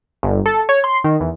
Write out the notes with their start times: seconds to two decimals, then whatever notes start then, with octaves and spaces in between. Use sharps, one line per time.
0.23 G1
0.46 A4
0.69 C#5
0.84 C6
1.04 D#3
1.20 E2